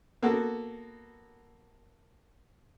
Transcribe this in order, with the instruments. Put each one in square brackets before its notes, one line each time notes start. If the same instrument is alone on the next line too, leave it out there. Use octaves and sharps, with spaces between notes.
[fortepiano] A#3 B3 F#4 A4